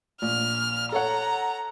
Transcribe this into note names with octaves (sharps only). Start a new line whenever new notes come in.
A#1 F6
A4 C#5 F#5 A#5